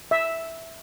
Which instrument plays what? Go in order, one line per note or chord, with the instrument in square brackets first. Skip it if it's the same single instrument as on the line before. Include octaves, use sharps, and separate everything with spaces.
[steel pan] E5